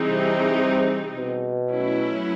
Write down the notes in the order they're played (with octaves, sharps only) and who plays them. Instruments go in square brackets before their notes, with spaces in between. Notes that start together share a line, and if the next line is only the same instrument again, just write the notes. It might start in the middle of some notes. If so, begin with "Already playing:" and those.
Already playing: [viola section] E3 G3 C4 D#4 G#4
[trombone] C3
B2
[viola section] F#3 A3 C#4 E4